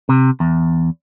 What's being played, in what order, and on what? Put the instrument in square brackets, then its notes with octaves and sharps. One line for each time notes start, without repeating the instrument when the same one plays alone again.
[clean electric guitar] C3
E2